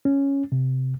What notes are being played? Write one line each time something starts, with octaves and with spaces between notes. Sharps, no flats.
C#4
C3